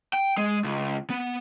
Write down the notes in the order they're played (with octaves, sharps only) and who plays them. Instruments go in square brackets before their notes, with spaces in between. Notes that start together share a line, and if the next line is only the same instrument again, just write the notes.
[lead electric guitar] G5
G#3
C#2
B3